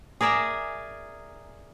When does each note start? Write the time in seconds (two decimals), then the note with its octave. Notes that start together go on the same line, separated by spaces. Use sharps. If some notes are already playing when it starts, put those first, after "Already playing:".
0.21 G#4 A#4 D5 E5 G#5 A#5